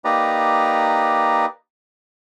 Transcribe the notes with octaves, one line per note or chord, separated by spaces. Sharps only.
A#3 D#4 G4 B4 D5 A#5